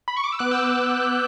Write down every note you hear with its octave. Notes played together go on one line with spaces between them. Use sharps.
B5
C#6
D6
E6
B3 D6 F#6
E6 G6